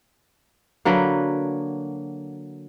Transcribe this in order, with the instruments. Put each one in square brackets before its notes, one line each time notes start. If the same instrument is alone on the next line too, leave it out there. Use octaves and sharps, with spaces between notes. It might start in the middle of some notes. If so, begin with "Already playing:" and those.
[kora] D3 F#3 A#3 B4